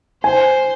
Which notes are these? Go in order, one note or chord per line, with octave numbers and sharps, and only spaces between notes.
C5 G#5